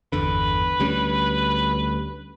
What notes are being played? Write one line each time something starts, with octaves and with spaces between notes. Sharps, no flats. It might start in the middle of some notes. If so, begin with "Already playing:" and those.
G1 E2 D3 B4
D2 G3 C#4